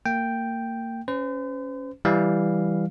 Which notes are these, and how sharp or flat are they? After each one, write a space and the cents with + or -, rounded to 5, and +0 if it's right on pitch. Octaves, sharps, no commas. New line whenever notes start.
A#3 -30 G5 +0
C#4 +0 C5 -45
E3 +0 G3 +0 F5 +0